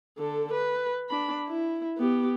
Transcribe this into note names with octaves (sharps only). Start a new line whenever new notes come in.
D3 A4
B4
D4 B5
E4
B3 G4